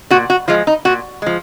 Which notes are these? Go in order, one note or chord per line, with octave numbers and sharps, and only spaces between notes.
A#2 F#4
F#4
F3 G#3 F4
D#4
A#2 F#4
F3 G#3